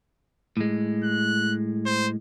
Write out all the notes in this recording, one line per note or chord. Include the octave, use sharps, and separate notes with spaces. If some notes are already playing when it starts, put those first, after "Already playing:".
A2 G#3
F#6
C5